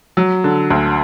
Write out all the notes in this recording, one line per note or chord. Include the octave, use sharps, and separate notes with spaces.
F#3
D3
D2